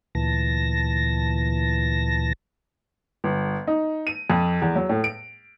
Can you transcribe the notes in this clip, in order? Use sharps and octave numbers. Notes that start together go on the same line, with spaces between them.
D2 A#2 E3 A5 A#6
G1
D#4
D#7
F2
E2
F#3
A2
D7